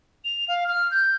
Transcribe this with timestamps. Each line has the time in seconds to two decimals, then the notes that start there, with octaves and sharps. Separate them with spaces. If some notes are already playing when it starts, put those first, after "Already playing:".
0.25 F7
0.48 F5
0.68 F6
0.91 G6